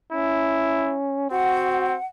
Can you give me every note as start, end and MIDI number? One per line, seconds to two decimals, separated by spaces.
0.12 1.29 61
0.12 0.96 64
1.31 1.96 60
1.31 1.95 66
1.31 2.05 78